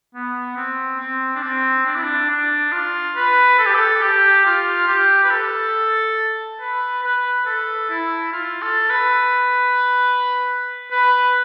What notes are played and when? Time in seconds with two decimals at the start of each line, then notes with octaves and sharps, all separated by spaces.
0.15 B3
0.57 C4
1.00 C4
1.36 D4
1.43 C4
1.87 D4
1.96 E4
2.03 D4
2.30 D4
2.72 F4
3.16 B4
3.59 A4
3.66 G4
3.75 A4
4.02 G4
4.46 F4
4.88 G4
5.24 B4
5.31 A4
6.61 B4
7.04 B4
7.46 A4
7.90 E4
8.33 F4
8.62 A4
8.90 B4
10.91 B4